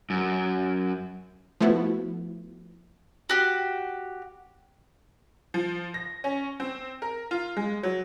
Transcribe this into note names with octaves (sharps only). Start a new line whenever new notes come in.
F#2
F3 A3 B3 E4 F#4
F#4 G4
F3
A#6
C#4
C4
A#4
F4
G#3
F#3